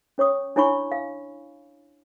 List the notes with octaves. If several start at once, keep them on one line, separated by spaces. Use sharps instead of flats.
C#4 C#5 C#6 D#6
D4 E4 C#5 G#5 B5 C#6
F5